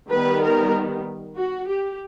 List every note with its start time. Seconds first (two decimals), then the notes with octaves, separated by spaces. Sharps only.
0.12 D#3 G3 B3 B4
0.43 A#4
1.37 F#4
1.68 G4